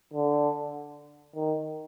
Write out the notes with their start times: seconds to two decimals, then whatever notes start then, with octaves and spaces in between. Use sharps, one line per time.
0.14 D3
1.36 D#3